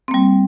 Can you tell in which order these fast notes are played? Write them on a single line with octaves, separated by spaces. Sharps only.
C4 A#3 G3